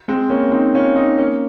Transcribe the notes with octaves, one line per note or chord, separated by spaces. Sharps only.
G#3 C4
A#3 C#4
C4 D#4
C#4 F4
C4 D#4
A#3 C#4